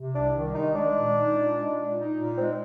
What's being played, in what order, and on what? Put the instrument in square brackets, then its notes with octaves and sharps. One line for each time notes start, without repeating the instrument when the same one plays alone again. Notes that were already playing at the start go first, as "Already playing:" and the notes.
Already playing: [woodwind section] C3
[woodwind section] C2 [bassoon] D4
[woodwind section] D#3
[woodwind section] G#3 [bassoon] D#4
[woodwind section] G#3 [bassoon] D4
[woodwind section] A#2
D#4
A#2
G#3
A#2
D#4
A#2
[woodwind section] G#3 [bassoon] C4